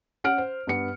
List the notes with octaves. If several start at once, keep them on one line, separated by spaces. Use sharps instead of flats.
C#4 F#5 F6 D7
C5
G2 B3 C#7